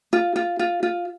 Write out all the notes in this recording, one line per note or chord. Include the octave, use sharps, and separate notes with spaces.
F4
F4
F4
F4